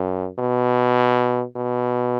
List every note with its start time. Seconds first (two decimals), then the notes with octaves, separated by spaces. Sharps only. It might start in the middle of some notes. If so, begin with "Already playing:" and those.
Already playing: F#2
0.39 B2
1.56 B2